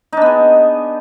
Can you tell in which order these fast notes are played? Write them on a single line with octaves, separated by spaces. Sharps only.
D#4 D4 B3 G#4